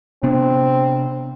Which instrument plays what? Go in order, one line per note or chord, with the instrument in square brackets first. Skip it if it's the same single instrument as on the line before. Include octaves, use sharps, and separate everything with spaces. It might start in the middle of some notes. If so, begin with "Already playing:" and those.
[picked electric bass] C3 B3 D4 [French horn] C4